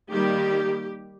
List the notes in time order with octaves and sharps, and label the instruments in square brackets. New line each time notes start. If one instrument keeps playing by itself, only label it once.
[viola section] D#3 G3 A#3 G4